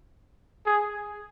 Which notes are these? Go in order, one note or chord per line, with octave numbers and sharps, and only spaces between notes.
G#4